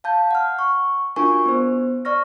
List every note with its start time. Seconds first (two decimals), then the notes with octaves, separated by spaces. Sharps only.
0.04 F5 A5 G6
0.31 F#5 F6
0.59 C#6
1.16 D4 F4 F#4 A#4 G#5 C#6
1.46 B3 C5
2.05 D5 C#6 F6 A#6